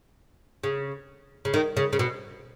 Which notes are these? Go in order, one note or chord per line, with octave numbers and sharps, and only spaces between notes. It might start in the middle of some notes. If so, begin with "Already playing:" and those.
C#3
C#3
D#3
C#3
C#3
B2